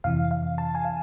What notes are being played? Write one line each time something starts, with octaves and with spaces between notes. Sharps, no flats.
F2 C3 E3 F5
F5
A5
G#5
F5